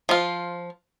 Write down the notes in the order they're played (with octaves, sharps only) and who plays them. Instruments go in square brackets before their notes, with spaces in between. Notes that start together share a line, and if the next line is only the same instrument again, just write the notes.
[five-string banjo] F3 F4